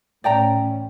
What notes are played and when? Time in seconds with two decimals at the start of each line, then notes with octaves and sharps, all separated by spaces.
0.24 A1 A2 C#4 D5 G5 A#5